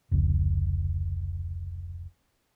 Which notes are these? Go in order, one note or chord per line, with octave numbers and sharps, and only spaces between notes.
F1 C#2